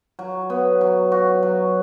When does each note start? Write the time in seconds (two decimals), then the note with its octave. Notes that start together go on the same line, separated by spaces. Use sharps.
0.19 F#3
0.50 B3
0.81 F#3
1.12 F#4
1.43 F#3